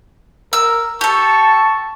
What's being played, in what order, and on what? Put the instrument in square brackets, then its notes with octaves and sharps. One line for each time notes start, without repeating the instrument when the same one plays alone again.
[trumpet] A#4 [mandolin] E6
[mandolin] G4 A4 [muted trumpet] A5 [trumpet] C#6